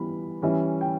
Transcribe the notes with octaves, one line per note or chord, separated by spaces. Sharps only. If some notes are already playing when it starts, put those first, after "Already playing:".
Already playing: E3 G3 B3 B5
E3 G3 C#4 E4
G5